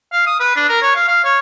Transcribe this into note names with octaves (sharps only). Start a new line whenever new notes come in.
F5
D#6
B4
D4
A#4
C#5
F5
F5
C#5